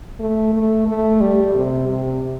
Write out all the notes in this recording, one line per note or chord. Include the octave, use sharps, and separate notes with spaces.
A3
A3
A3
G3
C3
C3